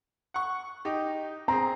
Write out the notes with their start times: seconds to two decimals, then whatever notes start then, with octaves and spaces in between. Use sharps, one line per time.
0.34 F#5 C#6
0.85 D#4 G4
1.48 C4 G#4 A#5